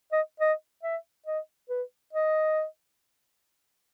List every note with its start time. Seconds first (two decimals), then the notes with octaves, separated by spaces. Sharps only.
0.12 D#5
0.40 D#5
0.83 E5
1.26 D#5
1.70 B4
2.13 D#5